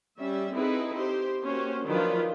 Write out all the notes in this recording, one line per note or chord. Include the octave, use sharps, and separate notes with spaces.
G3 C#4 E5
C4 D#4 E4 G#4 A4 B4
G4 C5
A#3 C#4 F#4 G4 C5
D#3 F3 F#3 D4 F4 B4